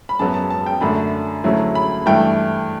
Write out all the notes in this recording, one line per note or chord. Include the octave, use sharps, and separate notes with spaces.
B5
F#2 C#3 F#3 B3 A5
A5
A5
G5
F#2 D3 A3 D4 B5
D2 C#3 F#3 A3 E4
B5
G2 E3 A3 E4 G5